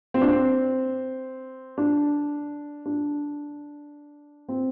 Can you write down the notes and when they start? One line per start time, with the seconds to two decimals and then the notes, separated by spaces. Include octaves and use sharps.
0.14 C4
0.21 D4
0.28 C4
1.78 D4
2.86 D4
4.49 C4